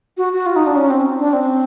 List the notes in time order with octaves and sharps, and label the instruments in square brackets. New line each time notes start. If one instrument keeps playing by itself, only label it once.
[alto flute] F#4
F#4
F4
D#4
D4
C#4
C4
D4
C4